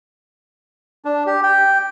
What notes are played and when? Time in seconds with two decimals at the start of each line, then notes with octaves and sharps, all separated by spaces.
1.05 D4
1.26 G4
1.43 G5